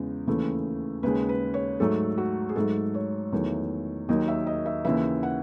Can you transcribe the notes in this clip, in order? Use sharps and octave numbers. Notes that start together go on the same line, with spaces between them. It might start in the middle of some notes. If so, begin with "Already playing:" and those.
Already playing: E2 C#3 G#3
D#2 C#3 E3 A3
D#2 C#3 G#3 B4
B4
C#5
G#2 F#3 A3 A4
F#4
G#4
G#2 F#3 A3 A4
C#5
E2 D#3 F#3 A3
D#2 D#3 F#3 D#5
E5
D#5
E5
D#2 C#3 E3 E5
F#5